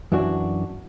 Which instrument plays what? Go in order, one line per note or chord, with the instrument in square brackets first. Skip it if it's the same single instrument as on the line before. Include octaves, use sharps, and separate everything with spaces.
[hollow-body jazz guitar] F#2 E3 D4 F#4